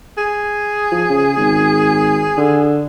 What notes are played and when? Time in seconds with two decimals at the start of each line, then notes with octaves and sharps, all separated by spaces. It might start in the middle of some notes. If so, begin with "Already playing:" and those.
0.17 G#4
0.92 F3
1.10 C#3
1.37 G#1
2.37 D3